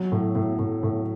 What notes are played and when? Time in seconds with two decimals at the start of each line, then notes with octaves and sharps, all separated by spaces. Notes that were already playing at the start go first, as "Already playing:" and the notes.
Already playing: F#3
0.12 A2
0.35 A2
0.59 A2
0.83 A2